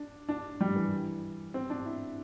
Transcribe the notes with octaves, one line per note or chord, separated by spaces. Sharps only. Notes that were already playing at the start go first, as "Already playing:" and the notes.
Already playing: D4
D4
G3
E3
C4
D4
E4